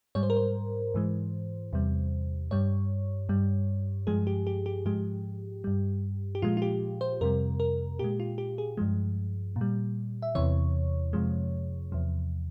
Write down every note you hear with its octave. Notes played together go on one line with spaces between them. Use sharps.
G#2 G3 C#5
C5
A#4
C5
G#2 E3 G#3
E2 C3 G3
G2 G3 C#5
G2 G3
G2 F3 G#3 G#4
G4
G4
G4
G#2 F3 G#3 G4
G2 G3
G4
A#2 F3 G#3 F4
F4
G4
C5
F2 C3 G3 A#4
A#4
A#2 G#3 G4
F4
G4
G#4
G2 F3 G#3
A#2
G3
E5
E2 C3 E3 C#5
F2 C3 F3 G#3
E2 C3 F3